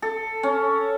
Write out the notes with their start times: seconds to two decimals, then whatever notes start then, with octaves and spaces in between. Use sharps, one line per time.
0.02 A4
0.43 C#4